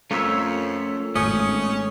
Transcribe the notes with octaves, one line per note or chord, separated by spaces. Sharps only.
F2 A3 C#4 F4 A#4 C#5 E5
G#1 G#2 A3 C#4 D#6